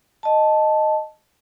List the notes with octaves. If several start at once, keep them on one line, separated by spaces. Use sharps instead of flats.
D#5 A5